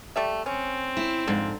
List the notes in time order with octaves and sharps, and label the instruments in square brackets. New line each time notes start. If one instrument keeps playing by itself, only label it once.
[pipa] G3 A3 E5
[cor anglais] C4 [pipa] C#4
[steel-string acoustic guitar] E4
[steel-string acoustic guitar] F2 G#2 [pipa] D3